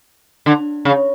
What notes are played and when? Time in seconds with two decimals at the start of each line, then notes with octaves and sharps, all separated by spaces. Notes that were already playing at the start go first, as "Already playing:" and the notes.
0.46 D3
0.85 C#3